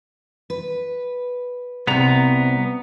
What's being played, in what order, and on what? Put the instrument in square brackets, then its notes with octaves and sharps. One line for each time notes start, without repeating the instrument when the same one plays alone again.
[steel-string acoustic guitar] B4
[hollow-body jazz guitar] C2 C3 [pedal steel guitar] B3 A#5